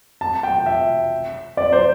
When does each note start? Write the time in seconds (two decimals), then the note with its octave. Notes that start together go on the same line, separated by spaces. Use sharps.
0.21 A5
0.43 G5
0.66 E5
1.57 D5
1.72 C5